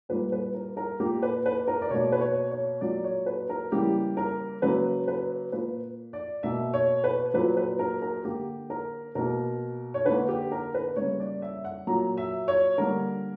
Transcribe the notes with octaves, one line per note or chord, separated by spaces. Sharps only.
A#2 G3 A#3 B4
B4
A#4
A#4
A#2 A#3 G4
B4
B4
A#4
D5
B2 A#3 C#5
B4
C#5
C#5
A#2 F#3 A#3 D5
C#5
B4
A#4
C#3 E3 G3 A#3 G4
A#4
C#3 F#3 A#3 B4
B4
A#2 A#3 B4
D5
B2 A#3 E5
C#5
B4
A#2 F#3 A#3 B4
B4
A#4
A#4
D3 A#3 G4
A#4
B2 A#3 A#4
C#5
D3 A#3 B4
G4
A#4
B4
C#3 G3 A#3 C#5
D5
E5
F#5
A#2 F#3 A#3 A#5
E5
C#5
D3 G3 A#3 A#4